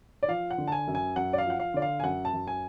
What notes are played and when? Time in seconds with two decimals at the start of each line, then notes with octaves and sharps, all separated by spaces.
0.23 D5
0.28 F3 F5
0.51 F#5
0.58 D3
0.68 A5
0.72 G#5
0.88 F#2
0.95 G#5
1.16 F#2 F#5
1.33 D5
1.38 F5
1.46 F3 F#5
1.60 F5
1.74 D3 D5
1.82 F5
2.00 G#5
2.03 F#2 F#5
2.25 A5
2.33 F#2
2.47 G#5